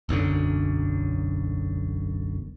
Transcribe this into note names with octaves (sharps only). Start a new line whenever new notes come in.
E1 B1 F#2 D3